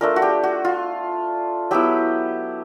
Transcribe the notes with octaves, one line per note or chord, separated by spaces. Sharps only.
A3 D4 F4 A#4
F#4
G4
F#4
F4
F#3 B3 E4 G4